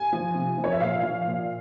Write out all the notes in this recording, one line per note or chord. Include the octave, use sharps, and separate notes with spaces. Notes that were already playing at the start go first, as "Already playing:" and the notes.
Already playing: G#5
F3
C3
F3
C#5
E5
A#2 F5
F3
A#2